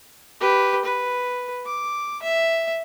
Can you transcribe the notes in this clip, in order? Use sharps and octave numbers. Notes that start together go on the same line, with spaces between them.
G4 B4
B4
D6
E5